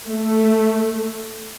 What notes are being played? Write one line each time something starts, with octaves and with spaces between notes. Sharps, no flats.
A3